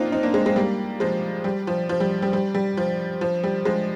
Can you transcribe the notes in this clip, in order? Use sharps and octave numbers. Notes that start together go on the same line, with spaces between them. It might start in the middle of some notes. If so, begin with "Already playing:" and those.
Already playing: A#3 C4 D4 D#4 F4
C4 D#4
A#3 D4
G#3 C4
G#3 C4
G3 A#3
F3 G#3
G3
F3
F3
G3
G3
G3
G3
F3
F3
G3
F3 G#3